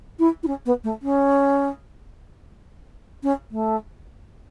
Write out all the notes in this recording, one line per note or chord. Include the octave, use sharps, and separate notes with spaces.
E4
E4
C#4
B3
A3
C#4
C#4
A3